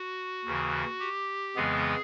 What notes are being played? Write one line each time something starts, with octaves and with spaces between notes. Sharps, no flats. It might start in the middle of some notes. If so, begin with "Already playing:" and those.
Already playing: F#4
D#2 C#3 E3
G4
F2 C#3 E3 G#3 B3 G#4